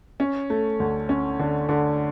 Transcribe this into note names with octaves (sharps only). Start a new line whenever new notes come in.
C#4
A3
D2
C#4
D3
D3